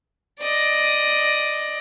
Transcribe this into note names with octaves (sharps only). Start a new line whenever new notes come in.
D5 D#5